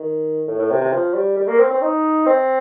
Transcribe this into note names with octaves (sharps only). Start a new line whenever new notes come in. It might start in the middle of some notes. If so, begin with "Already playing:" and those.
Already playing: D#3
A2
A2
C3
C3
F3
G3
G3
A#3
C4
C4
D#4
C4